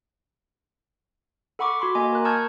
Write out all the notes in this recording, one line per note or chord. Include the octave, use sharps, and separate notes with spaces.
A4 F#5 B5 C#6 D6
F#4 B5 C6 D6
A#3 D#5 G#5
A#4 F#6
A5 C#6 D#6 F6 G6 G#6